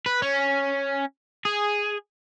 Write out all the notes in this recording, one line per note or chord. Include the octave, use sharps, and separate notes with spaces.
B4
C#4
G#4